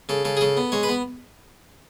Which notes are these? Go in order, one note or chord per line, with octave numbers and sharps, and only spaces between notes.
C#3 A4
C#3 A4
G#4
C#3 A4
B3
G#3 C#5
B4
B3